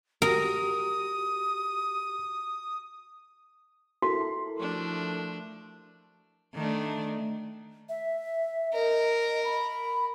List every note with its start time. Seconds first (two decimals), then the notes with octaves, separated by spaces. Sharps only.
0.22 F#4 G4 A#4 D#6
4.02 E4 F#4 A4 A#4 C6
4.59 F3 A3 D4
6.54 D#3 A3 D4
7.89 E5
8.74 A#4 D#5
9.44 B5